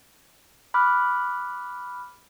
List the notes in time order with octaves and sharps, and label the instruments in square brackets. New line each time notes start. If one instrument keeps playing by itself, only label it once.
[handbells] B5 D6 F6 F#6